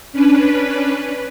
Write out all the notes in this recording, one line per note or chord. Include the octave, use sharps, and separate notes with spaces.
C#4 D4 B4